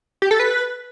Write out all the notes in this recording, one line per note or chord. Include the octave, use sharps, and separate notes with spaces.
G4
A4
B4